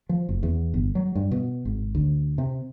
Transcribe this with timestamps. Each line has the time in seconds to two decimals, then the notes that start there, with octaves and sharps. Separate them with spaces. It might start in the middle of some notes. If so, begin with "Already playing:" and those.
0.09 F3
0.29 F#1
0.43 E2
0.74 G1
0.95 F#3
1.15 G2
1.31 B2
1.65 G#1
1.95 D2
2.38 C3